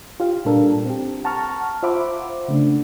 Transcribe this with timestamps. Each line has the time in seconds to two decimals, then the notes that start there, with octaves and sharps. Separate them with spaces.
0.20 F4 G4 F5
0.45 A#2 G3 D4 A4 A#4
0.85 C4 G4
1.24 F#5 A5 A#5 C#6 F6
1.83 F4 C5 E5 F#5 B5 D6
2.48 C#3 A3 D4